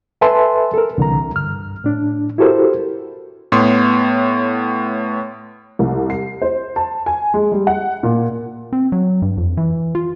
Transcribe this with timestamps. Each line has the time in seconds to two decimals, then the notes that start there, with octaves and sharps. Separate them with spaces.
0.21 A4 B4 E5 G#5 A5 C6
0.74 A4 A#4
0.98 C2 D3 E3 A#5
1.35 G2 F6
1.84 A2 D4
2.38 E4 F#4 G4 A4 A#4 C5
3.52 A2 B3 C#5 C6
5.79 C2
6.10 C7
6.42 C5
6.76 A5
7.06 G#5
7.34 G#3
7.52 G3
7.67 F#5
8.03 A#2
8.73 C4
8.92 F#3
9.22 G2
9.37 F2
9.57 E3
9.95 F4